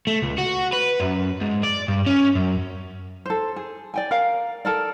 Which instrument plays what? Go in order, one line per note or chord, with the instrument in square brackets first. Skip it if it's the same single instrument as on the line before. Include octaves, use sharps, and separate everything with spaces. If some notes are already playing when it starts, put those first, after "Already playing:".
[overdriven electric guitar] A3
C#2
F#4
B4
F#2
G#2
D5
G2
C#4
F#2
[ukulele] A4 C5
G#4
D5 G5 G#5
A#4 F5
A4 A#4 D5